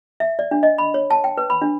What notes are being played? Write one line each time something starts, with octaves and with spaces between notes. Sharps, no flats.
E5
D5
D4
D#5
B5
C#5
A5
G5
B4
B5
D4